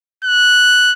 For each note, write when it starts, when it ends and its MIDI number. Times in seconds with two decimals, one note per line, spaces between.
0.24 0.93 90